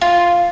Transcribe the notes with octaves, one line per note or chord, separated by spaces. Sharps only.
F4